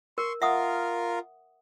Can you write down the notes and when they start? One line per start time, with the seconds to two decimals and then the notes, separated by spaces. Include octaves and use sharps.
0.18 A#4 C6 C#6
0.42 F4 A#4 E5 F#5 D#6